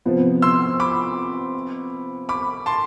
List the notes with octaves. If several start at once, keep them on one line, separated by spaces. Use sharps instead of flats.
C3 F3 B3
C6 E6
B5 D6
B5 D6
A5 C6